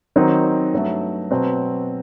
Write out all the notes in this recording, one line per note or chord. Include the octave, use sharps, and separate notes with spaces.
D#3 F#3 C4 D#4
G2 F#3 A3
B2 F#3 C4